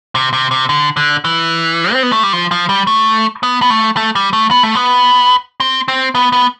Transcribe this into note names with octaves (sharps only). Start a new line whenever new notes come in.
C3
C3
C3
D3
D3
E3
C4
B3
A3
G3
F3
F3
G3
A3
B3
B3
A3
A3
G3
A3
B3
A3
B3
C4
C4
B3
B3